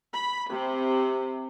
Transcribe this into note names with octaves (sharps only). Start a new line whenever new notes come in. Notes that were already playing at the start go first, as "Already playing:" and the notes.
B5
C3